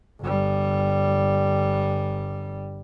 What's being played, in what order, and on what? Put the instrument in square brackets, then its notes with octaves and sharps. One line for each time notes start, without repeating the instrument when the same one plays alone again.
[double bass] G1 G3